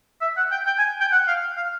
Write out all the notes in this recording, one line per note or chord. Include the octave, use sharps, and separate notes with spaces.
E5
F#5
G5
G5
G#5
G5
F#5
F5
F5